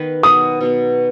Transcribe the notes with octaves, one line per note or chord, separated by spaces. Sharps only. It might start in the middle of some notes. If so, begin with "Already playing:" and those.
Already playing: D#3 B3 D#4 B4
B2 F#3 B3 D#6
B2 F#3 B3